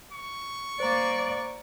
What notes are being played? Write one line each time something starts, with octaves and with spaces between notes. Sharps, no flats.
C#6
A#3 C5 D5 A#5